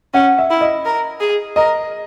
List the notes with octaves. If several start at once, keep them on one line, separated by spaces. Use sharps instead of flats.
C#4 F#5
E5
E4
D#5
A#4
G#4
A#4 D#5